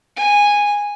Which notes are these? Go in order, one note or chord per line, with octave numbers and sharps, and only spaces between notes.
G#5